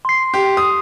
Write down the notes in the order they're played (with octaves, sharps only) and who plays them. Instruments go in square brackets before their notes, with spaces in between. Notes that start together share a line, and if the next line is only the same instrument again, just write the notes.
[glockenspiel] C6 C7
[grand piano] G4
D#6